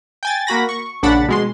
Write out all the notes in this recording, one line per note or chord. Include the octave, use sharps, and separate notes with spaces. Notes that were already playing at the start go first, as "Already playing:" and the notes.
G5 G#5 A6
A#3 F#4 B5 A#6
C#6
A#1 C#3 D4 F#5 B5 A6
B2 G#3 C6